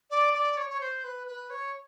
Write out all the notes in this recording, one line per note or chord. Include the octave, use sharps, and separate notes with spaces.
D5
D5
C#5
C#5
C5
B4
B4
C#5